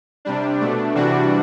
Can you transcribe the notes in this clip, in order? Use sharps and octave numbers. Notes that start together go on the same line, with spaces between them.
C3 G3 D4
B2 A3 D4
C3 E3 G3 D4 F#4